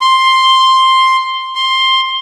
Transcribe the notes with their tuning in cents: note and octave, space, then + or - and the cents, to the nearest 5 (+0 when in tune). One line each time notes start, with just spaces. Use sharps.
C6 +5
C6 +10